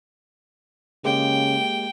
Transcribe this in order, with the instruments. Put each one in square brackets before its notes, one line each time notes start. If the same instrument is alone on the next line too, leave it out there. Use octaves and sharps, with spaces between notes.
[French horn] C#3 [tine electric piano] G#3 A#3 G4 [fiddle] G5